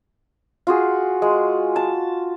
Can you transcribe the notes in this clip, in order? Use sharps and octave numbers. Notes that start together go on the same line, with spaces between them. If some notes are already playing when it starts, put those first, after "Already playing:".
F4 F#4 G#4
G#3
A5